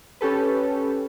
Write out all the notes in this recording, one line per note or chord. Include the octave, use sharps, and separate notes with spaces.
C#4 G4 A4 B4